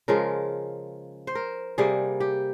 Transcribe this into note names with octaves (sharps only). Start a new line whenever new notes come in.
C#3 F3 G#3 A#4
C5
A#4
C3 G3 A#3 G#4
G4